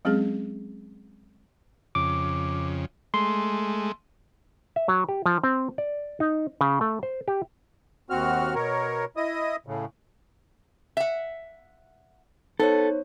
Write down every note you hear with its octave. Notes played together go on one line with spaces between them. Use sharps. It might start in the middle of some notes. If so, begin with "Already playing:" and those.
F#3 G#3 C4 C#4 G#4
F2 C#3 D6
G#3 A3 C6
E5
F#3
G4
F3
C4
D5
D#4
C#3
A3
C5
G4
D#2 C4 F#4 F6
B2 A#4 C#5
E4 D#5 D#6
A2 C#3
E5 F#5
B3 D#4 A4 C5 C#5